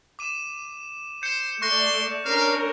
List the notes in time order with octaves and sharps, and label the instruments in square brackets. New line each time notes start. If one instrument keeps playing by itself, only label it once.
[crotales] D6 D#7 E7
[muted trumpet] C5 [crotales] G6 C#7 E7
[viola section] A3 D5 [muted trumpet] C6 [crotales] C#6 F#6 A#6
[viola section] C#4 D4 A#4 [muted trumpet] F5